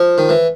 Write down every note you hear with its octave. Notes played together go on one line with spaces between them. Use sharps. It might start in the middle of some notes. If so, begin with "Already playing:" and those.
Already playing: F3
D#3
E3